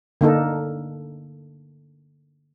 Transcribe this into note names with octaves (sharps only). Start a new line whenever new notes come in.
D3 A#3 D#4 A4